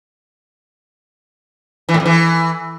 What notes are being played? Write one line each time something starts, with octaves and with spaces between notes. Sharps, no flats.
E3
A2
F2
E3